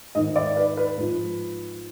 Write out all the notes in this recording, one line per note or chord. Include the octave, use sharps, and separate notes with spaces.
G#2 D#3 D#5
D5
B4
B4
G#2 F3